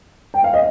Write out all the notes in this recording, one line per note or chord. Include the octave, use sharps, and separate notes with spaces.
G5
F5
D#5